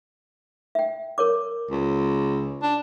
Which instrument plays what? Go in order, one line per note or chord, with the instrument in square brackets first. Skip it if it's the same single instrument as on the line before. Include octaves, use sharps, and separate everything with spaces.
[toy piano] E5 G5
A#4 C#5 D6
[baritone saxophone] C#2
D4